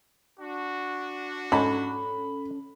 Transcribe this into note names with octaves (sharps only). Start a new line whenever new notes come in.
D4 F#4
G#2 C#4 A4 B5